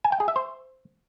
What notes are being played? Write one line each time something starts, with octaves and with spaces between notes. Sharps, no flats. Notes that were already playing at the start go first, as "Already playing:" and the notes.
G#5
G5
G#4
E5
C5